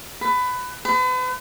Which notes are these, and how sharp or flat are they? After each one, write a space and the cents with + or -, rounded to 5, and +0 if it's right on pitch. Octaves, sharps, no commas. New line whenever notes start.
B4 +20
B4 +40